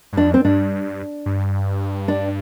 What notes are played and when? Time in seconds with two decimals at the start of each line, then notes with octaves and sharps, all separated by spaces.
0.13 G2
0.17 F2 D4
0.34 C4
0.45 G2 D4
1.26 G2
2.08 D4